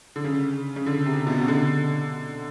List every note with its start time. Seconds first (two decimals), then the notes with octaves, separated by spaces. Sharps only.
0.16 D3
0.24 C#3
0.76 C#3
0.86 D3
1.06 C3
1.27 B2
1.42 C#3
1.48 D3